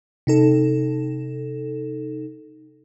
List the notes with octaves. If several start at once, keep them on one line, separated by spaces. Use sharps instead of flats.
C3 D#4 A4